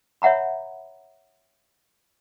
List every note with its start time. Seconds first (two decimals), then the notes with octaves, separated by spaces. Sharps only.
0.22 C#5 E5 F#5 A#5 B5